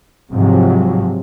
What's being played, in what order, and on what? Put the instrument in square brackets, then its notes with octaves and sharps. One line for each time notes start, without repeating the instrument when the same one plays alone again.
[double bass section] G#2 C3 F3 F#3